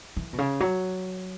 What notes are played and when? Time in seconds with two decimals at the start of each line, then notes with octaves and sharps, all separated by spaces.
0.17 E3
0.33 B2
0.38 C#3
0.60 F#3